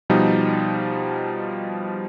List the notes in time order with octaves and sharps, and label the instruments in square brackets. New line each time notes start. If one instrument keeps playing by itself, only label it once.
[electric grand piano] B2 F3 G3 D#4